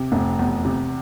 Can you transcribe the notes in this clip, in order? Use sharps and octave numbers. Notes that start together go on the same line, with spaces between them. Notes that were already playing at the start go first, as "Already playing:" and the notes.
Already playing: C3
F1
E2
C3